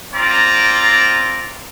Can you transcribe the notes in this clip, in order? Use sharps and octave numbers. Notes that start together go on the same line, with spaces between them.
C4 F4 D5 A#5